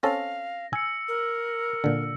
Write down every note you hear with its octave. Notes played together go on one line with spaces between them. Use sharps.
C4 C#4 A4 F5 A#6
G#5 E6 C#7
A#4
A#2 D3